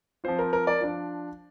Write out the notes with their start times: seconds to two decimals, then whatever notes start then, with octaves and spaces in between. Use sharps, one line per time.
0.24 F3 C4 F4 C5
0.39 A#4
0.53 A#4
0.67 A#4 D5
0.81 F3 D4 F4